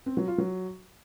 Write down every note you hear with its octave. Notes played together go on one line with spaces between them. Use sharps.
C4
F#3
F4
F#3